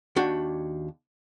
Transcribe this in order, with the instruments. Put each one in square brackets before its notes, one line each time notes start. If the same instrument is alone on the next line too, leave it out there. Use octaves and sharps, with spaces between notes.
[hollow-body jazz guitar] D#2 D4 F#4 G5